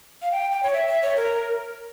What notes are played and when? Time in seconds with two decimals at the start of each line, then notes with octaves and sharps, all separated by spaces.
0.22 F5
0.31 G5
0.52 G5
0.63 C#5
0.73 E5
0.87 E5
1.02 C#5
1.16 A#4